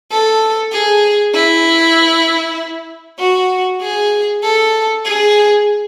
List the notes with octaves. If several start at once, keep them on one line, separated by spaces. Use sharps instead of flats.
A4
G#4
E4
F#4
G#4
A4
G#4